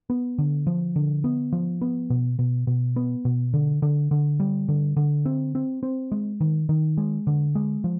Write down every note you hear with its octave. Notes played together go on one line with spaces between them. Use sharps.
B3
D3
F3
D3
B3
F3
B3
B2
B2
B2
B3
B2
D3
D3
D3
G3
D3
D3
C4
C4
C4
G#3
D#3
D#3
G#3
D3
G#3
F3